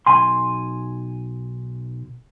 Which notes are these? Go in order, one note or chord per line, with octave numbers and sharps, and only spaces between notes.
B1 G#5 C6